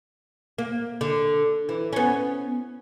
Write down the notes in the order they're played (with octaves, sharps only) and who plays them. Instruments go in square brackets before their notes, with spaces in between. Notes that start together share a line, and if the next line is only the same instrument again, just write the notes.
[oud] A#3
D3
E3
B3 C#4